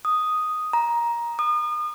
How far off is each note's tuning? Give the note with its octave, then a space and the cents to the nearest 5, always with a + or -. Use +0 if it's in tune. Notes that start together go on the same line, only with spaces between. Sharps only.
D#6 +0
A#5 +15
D#6 -35